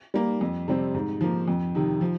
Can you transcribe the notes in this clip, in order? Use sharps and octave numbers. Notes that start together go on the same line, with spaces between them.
G3 A#3
F2
C3 G3 C4
G#2
F3 A#3
F2
C3 D#3
F3